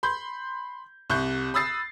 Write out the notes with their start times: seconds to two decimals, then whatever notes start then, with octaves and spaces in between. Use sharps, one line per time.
0.03 B5 C6 G6
1.10 C2 C#6 F#6 G6
1.54 B5 D#6 E6 A6 C7